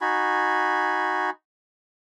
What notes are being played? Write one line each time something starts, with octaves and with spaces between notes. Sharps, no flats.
D#4 F#4 G#5 B5